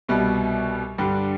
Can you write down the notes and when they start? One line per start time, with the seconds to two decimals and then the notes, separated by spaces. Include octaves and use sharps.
0.08 C2 B2 G3
0.98 G2 D3 G3 D4 G4